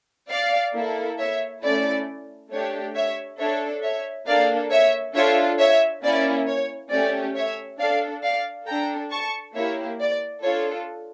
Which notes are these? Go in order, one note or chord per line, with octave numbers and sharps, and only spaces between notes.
D5 F5
A#3 E4 A4
C#5 E5
A3 C#4 E4 A4 D5
A3 D4 G4 C#5
C#5 E5
D4 A4 C#5 E5
C#5 E5
A#3 D4 A4 D5 F5
C#5 E5
D4 F4 A4 C#5 E5
C#5 E5
A#3 C#4 E4 D5
C#5
A3 C#4 G4 D5
C#5 E5
D4 A4 D5 F5
D5 F5
D4 A4 G5 A#5
A5 C#6
A#3 E4 G4 C#5 E5
D5
D4 F4 A4 C#5